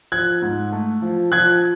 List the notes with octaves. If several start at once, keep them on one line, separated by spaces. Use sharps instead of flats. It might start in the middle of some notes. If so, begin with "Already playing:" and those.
F3 F#6 G#6
G#2
A3
F3
F3 F#6 G#6